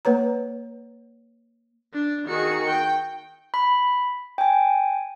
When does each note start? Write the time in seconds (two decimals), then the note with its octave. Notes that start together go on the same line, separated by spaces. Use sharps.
0.05 A#3 B4 C#5 A#5
1.93 D4
2.27 D#3 F#4 G#4 C#7
2.68 G5
3.54 B5
4.38 G5 G#5